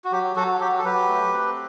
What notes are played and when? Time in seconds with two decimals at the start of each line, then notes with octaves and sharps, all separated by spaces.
0.04 F#4
0.12 F#3 G4
0.36 F#3 F#4 A4
0.61 F#3 G4
0.79 A4
0.85 F#3 G4 B4
1.09 A3
1.33 C4